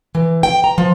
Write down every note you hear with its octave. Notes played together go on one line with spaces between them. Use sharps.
E3
G5
A#5
F3